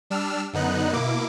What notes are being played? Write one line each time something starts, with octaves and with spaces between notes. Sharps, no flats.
G3 D4 E6 F6
F#2 D3 B3 D#4 F#6
B2 A#3 E4 D6